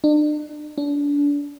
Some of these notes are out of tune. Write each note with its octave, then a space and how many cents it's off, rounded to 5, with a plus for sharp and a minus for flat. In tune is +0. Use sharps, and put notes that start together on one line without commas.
D4 +40
D4 -30